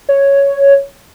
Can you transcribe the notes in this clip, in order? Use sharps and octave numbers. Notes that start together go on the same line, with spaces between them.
C#5